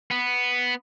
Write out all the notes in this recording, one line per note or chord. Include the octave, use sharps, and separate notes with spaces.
B3